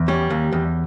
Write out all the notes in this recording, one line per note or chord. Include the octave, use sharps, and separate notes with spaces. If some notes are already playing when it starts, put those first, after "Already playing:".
Already playing: E2
G3 C#4
D#2
E2